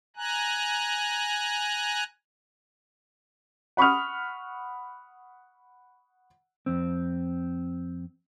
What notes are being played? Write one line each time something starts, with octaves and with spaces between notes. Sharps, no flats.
G#5 A#5 F#6
F#5 B5 C#6 D#6 F6
F2 C4